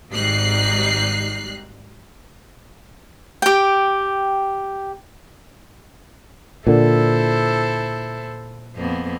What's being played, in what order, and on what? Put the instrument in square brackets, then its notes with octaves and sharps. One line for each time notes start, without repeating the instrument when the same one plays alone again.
[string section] G#1 G#2 G3 D#4 F#6 C7
[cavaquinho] G4 G5
[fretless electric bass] A#2 D3 [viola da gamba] E4 A4 C5
[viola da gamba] F2 A#3 B3